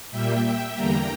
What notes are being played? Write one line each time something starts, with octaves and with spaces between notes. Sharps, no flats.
A#2 G3 A#3 E5 G5
E5 G5
E2 D3 G3 A#3 G5 A#5